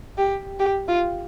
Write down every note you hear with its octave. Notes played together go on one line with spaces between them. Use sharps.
G4
G4
F4